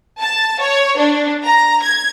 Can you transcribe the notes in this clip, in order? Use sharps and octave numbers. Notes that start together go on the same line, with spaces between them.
A5
C#5
D4
A#5
G#6